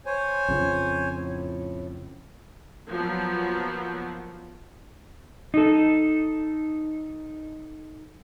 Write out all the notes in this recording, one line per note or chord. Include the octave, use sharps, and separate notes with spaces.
C5 C#5 G#5
F2 C#3 F3
A2
F3 F#3 A#3 B3
D#4 A4